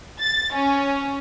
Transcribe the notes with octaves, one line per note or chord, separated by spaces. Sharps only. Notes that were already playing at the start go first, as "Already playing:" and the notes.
A6
C#4